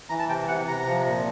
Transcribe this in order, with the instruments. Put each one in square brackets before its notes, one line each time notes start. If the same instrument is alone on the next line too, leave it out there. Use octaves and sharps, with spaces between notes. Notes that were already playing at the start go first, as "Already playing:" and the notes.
[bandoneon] E3 A#5
A5
C3 G5
C3 F#5
C3 A#5
F3
A#2